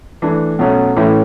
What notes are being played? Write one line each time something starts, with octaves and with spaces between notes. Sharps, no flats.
E3 A3 D4
B2 F#3 A3 C#4
A2 E3 A3 C#4 E4